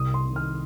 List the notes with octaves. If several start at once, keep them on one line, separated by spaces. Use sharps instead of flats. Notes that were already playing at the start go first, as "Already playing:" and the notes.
Already playing: C2 D#6
C6
C3 D#3
F6